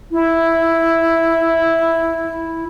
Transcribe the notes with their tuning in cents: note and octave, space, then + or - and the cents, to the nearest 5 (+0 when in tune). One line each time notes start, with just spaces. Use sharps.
E4 +0